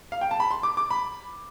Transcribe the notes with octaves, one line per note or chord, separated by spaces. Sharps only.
F5
G5
A5
B5
C6
D6
D6
B5